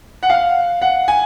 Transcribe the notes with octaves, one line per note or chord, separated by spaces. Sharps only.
F#5
F5
F#5
G#5